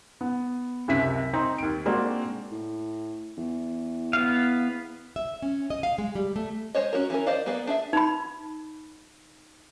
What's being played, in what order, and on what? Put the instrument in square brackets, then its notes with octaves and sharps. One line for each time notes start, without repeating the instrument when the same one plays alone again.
[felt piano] B3
C#2 F#2 C3 E5 B6
C4 D#4
D#2 D7
G#3 A#3 C4 D4 F#4
[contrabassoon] A2
E2
[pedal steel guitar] B3 F5
[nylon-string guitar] E5
C#4
D#5
F5
G#3
G3
A3
[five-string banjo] G#3 C5 C#5 D#5
C#4 F#4 A#4
E3 C#4 A#4
C5 D5 D#5 F5
A#3 B3 G#4 B4 D5
D4 G#4 E5
[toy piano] D#4 B5